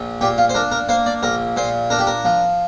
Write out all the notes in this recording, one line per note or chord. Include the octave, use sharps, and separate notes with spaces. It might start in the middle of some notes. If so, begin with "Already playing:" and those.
Already playing: A#1
A#2 G4
F4
C5
D4 A#4
A#4
A#3 C5
D5
A#1 A#4
A#2 C5
D4 A#4
G4
A#4
F3